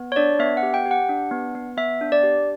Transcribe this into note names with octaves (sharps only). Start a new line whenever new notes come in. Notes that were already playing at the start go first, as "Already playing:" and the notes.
Already playing: B3
C#5
D4 D5
B3 E5
F#5
G4
G5
G4
F#5
D4
B3
B3
B3 E5
D4
D5
G4